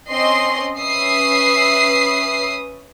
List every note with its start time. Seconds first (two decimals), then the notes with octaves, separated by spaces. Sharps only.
0.10 C4 C#4 D#5 C6 C7
0.79 C#4 B4 E5 D#6 C7